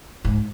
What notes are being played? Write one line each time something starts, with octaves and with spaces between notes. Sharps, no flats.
G#2